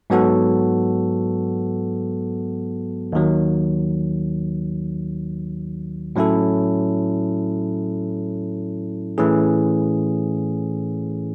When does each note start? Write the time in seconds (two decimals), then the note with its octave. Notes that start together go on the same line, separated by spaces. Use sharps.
0.10 G#2 F#3 B3 F#4 A4
3.13 D#2 D#3 F#3
6.16 A2 F#3 C#4 E4 A4
9.18 A2 E3 A3 C#4 G#4